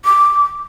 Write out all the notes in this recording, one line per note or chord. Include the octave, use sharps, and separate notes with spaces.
D6